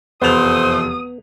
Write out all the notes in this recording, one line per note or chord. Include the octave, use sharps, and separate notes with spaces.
F1 E2 F3 A3 B3 C5 D#6 F7